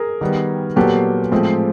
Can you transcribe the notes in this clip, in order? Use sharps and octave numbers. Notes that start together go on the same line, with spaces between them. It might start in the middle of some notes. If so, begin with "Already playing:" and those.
Already playing: G#4 A#4
D#3 G3 B3
A#2 F#3 B3 G4 A4
A2 F3 G#3 C4